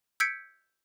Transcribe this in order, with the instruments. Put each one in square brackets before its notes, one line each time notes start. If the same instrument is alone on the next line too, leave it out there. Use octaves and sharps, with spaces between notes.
[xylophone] E6 G6 G#6 B6 C#7 D7